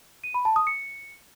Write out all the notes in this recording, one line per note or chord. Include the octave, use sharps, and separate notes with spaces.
D#7
B5
A5
D#6
C#7